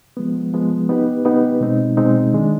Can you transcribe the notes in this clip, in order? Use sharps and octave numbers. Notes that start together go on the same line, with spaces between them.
F3 G#3 B3
F3 G#3 B3
B3 D#4 G4 B4
B3 D#4 G4 B4
B2 G#3 C4 D#4
B2 G#3 C4 D#4
D#3 G#3 D4